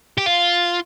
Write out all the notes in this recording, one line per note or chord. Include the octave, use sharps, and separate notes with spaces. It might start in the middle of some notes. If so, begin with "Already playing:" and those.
G4
F4